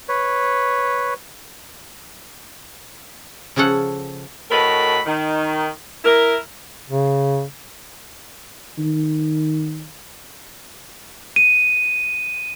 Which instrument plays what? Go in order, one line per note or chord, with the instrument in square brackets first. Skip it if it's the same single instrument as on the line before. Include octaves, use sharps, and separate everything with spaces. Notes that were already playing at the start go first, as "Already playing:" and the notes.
[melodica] B4 C#5
[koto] C#3 F3 C#4 A4 F#5
[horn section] A2 F#4 A4 A#4 D#5 B5
D#3
E4 A#4
[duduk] C#3
[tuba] D#3
[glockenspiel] D#7